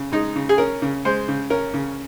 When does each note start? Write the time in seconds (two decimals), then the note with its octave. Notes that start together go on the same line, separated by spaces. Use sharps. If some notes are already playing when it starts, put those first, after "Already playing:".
Already playing: C#3
0.12 G#3 D#4
0.36 C#3
0.49 G#4
0.58 C#4 A#4
0.82 C#3
1.05 G#3 C5
1.28 C#3
1.50 C#4 A#4
1.74 C#3